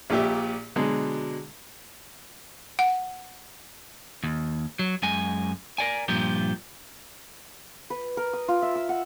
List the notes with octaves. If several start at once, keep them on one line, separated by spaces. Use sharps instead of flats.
A#1 A#2 G4 E5
B2 D3 F#3 G#3
F#5
D#2
F#3
F#2 G#3 G#5
A#4 D5 G#5
G2 A#2 F3 G4
B4
A#4
D#6
F4
E5
E6
F#5